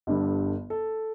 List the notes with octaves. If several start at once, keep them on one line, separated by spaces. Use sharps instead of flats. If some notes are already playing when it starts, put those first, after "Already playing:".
G1 G2 D3 G3
A4